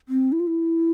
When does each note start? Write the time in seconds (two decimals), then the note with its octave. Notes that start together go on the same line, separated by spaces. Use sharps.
0.09 C4
0.32 E4
0.40 F4
0.47 E4